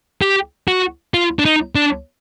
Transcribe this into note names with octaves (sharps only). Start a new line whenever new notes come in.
G4
F#4
F4
D4
D#4
D4